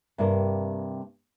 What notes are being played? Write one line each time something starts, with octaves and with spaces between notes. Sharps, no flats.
G2 C3 A#3 A#4